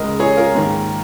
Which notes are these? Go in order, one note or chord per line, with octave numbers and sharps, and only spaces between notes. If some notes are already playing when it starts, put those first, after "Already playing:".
Already playing: C#2 C#3 G#3 A#4 D#5
G#4 C#5
F4 A#4
G#2 D#3 A#3